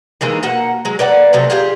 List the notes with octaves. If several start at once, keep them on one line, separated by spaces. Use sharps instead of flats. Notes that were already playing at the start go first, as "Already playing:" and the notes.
D#3 E3 G#3 A#3
B2 A#3 F#5
F#3 G#3
A#3 B4 D5 F#5
C3 F3 F#3 A3
F4 G4 G#4 F5